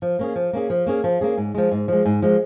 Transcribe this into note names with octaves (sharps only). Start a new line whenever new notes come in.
F3
A#3 C#4 G#4
F3
A#3 C#4 G#4
F3
A#3 C#4 G#4
F3
A#3 C#4 G#4
G#2
F3 G#3
G#2
F3 G#3
G#2
F3 G#3